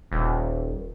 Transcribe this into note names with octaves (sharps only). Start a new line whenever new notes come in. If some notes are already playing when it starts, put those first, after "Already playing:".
D#1